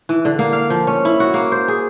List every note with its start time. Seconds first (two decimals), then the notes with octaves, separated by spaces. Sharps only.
0.09 E3
0.25 D3
0.39 A#3
0.53 F5
0.70 F3
0.87 C#4
1.05 E4
1.20 F#4
1.34 A#3
1.52 C5
1.68 G#4